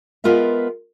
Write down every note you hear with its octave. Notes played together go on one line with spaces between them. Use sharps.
G#3 B3 F4 A#4 B4 E5